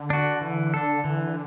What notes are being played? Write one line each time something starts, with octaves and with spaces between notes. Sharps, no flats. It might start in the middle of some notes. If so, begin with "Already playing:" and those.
Already playing: D3
D4 F#4
E3
D4 A4
D3 E3